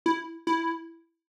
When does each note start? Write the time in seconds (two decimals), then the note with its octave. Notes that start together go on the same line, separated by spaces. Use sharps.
0.06 E4
0.47 E4